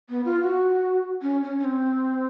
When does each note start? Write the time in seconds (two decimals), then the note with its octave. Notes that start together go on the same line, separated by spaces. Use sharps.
0.09 B3
0.25 F4
0.42 F#4
1.22 C#4
1.44 C#4
1.58 C#4
1.64 C4